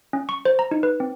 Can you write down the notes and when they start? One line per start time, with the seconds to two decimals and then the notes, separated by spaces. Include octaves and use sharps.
0.13 C#4
0.29 C#6
0.45 C5
0.59 A#5
0.71 D#4
0.83 B4
1.00 C4